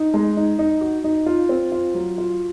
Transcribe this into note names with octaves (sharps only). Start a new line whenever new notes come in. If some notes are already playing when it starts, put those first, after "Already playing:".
Already playing: D#4
G#3
D#4
D#4
F#4
D#4
F4
C4
F4
F#3
F4